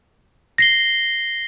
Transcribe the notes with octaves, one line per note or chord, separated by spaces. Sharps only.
A#6 C7 G7